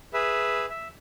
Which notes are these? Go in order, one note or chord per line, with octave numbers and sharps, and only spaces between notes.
G#4 B4 E5
E5